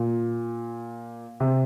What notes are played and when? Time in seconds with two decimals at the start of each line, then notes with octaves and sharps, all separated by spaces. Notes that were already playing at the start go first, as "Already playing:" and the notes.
Already playing: A#2
1.40 C3